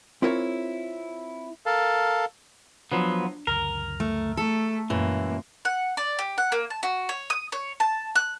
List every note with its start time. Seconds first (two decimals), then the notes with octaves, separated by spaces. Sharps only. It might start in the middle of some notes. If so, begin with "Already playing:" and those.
0.22 C4 E4 F4 A#4 C#5
1.66 A4 A#4 F5 A5
2.92 F3 F#3 B3 D4
3.47 C#2 F#2 D3 A#4
4.00 A3
4.37 A3 A4
4.90 F#2 A#2 E3 G#3 A#3
5.65 F#5
5.97 D5
6.19 G4
6.38 F#5
6.52 A#3
6.70 A5
6.83 F#4
7.09 C#5
7.30 D#6
7.52 C#5
7.80 A5
8.15 F#6